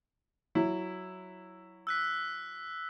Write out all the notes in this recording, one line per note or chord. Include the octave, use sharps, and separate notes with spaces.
F#3 E4
E6 F#6 B6